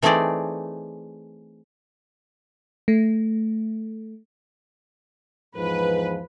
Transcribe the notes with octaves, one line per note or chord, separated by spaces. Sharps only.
E3 A3 C4 D#4 G#4 D5
A3
E2 G#2 F3 B4